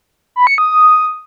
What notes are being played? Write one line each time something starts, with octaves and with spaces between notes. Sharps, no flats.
B5
C#7
D#6